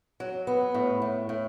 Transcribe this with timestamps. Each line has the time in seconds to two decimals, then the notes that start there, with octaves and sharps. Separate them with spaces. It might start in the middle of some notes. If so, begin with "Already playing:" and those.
0.20 F#3
0.47 B3
0.74 A2
1.02 A2
1.29 A2